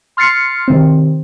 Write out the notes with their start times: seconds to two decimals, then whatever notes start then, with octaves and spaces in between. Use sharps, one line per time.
0.17 C6 F6 A6 C7 C#7
0.68 C3 D#3 C4